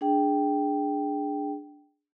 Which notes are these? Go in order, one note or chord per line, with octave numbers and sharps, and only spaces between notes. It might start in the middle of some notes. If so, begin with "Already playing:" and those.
D4 G#4 G5